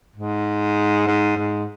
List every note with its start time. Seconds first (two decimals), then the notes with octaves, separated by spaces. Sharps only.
0.16 G#2
1.07 G#2
1.37 G#2